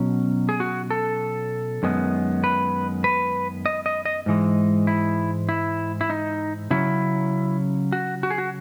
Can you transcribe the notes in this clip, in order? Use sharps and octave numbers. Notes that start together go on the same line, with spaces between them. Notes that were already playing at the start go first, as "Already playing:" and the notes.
Already playing: B2 F#3 C#4
G#4
F#4
A4
F#2 D#3 G#3 B3
B4
B4
D#5
D#5
D#5
G#2 E3 G#3
E4
E4
E4
D#4
C#3 F#3 C#4 E4
F#4
F#4
G#4
F#4